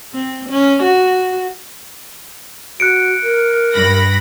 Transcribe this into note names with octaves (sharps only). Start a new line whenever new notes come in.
C4
C#4
F#4
F#4 F#6 C#7 D7
A#4
G2 B5 A#6